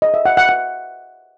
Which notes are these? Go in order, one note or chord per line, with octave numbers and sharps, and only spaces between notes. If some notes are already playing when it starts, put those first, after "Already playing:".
D#5
E5
F#5
F#5
F#5